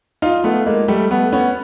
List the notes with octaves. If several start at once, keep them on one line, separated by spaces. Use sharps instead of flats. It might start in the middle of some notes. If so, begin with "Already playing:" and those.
D#4 F4
A3 B3
G#3 A#3
G3 A3
A3 B3
B3 C#4